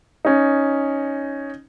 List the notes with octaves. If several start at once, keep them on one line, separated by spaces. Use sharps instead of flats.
C#4 D#4